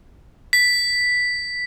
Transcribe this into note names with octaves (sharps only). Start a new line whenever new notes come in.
B6